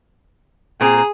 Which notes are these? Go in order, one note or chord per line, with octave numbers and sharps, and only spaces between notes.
A#2 C4 G#4 A#5